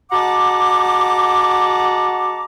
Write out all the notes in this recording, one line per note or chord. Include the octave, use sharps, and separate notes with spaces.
G#3 F#4 F#5 A5 A#5 D6